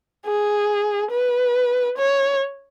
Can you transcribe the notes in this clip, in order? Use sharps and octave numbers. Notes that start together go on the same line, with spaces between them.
G#4
B4
C#5